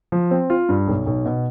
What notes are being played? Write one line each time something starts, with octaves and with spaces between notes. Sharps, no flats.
F3
C4
F4
G2
B1
B1
B2